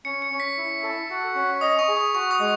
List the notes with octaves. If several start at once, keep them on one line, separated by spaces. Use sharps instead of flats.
C#4 C#7
C#7
C#4
B6
E4
A4
F#4
C#4
D#5 D#6
C#6
G#4
C#6
F#4 C#6
D#6
G#3